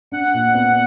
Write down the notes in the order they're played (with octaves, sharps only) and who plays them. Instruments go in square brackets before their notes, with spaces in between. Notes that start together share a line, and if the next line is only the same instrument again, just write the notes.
[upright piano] D4 [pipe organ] F#5
[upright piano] A#2
B3